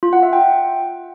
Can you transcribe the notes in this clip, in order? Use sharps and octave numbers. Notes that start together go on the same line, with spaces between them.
F4
F#5
E5
G5